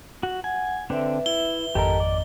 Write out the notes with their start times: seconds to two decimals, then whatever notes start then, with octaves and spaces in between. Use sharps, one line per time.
0.23 F#4
0.44 F#5 G#5
0.90 D3 C4 D4 B4 E5
1.26 E4 G7
1.75 G#1 F2 G4 A4 A#4 D#5
2.00 D5